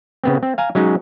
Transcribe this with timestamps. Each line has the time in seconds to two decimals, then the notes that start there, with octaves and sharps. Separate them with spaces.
0.24 C#3 B3 C4
0.43 C4
0.58 F5 G#5 A#5
0.75 F#3 G#3 C#4 D#4